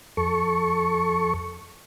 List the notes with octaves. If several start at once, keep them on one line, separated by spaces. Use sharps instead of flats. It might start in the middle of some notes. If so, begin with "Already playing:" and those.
F2 A4 C#6